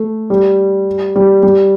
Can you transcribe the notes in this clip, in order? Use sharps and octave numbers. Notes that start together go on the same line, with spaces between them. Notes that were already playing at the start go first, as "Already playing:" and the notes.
Already playing: A3
G3
G3
G3